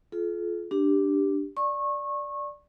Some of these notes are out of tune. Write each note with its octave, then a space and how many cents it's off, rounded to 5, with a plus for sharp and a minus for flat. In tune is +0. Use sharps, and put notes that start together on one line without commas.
F4 +0 A4 -45
D4 +0 G4 +0
D5 +0 C#6 -25